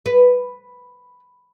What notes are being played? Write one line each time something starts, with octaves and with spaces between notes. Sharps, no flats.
B4